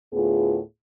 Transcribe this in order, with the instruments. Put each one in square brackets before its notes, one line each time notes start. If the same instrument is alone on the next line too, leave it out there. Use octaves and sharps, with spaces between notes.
[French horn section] D2 A2 B3 F4 G#4